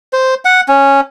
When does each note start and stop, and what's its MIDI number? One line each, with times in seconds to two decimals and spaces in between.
0.13 0.35 72
0.45 0.61 78
0.68 1.01 61